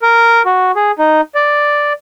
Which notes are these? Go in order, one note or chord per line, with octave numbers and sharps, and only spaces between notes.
A#4
F#4
G#4
D#4
D5